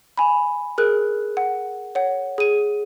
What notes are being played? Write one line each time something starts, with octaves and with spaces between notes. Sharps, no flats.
G#5 B5
G#4 A#4 F#6
F#5
C#5 F#5
G#4 D#7